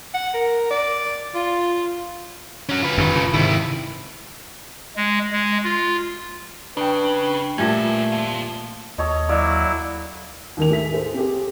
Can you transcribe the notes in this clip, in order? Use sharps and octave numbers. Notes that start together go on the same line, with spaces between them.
F#5
A#4
D5
F4
C#4 F#4
F4 B4
F#2 D#3
C#3
G#2 C3 D#3 E4
G#3
G#3
F4
C#3 D4 B4 G5
A#2 G3 A3 C#4 A4 G#6
F4 A4
D#2 A4 C#5 D#5
F#3 E4 D5 F5
D#2 D#3 F7
A2 G#4 A4 E5 B6
G#4 A4 C5
C4 G4 G#4